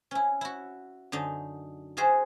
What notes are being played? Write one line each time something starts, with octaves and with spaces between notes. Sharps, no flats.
C#4 E4
E4 F#4
F#2 D3 D#4
D#4 F4 F#4 G#4 C5 E5